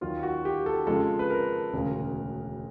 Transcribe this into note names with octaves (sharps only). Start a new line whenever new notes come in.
D#2 D#3 F#3 F4
F#4
G4
A4
F2 C#3 F3 G#3 A4
B4
A#4
E1 D2 C#3